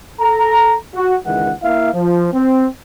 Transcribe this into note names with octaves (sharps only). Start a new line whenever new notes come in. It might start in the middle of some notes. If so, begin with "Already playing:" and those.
A4 A#5
F#4
C#2 D#3 E3 G#3 F#5
A#3 E4 E5 F5
F3
C4